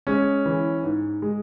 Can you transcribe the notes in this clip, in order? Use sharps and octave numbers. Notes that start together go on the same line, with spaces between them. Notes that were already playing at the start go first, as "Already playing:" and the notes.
G#3 C#4
E3
G#2
G#3